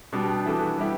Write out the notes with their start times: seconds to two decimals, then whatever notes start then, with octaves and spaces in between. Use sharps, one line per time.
0.13 B2 G3 D4 G4
0.45 E3 B3 D4 F#4 A4
0.78 G3 B3 E4 G4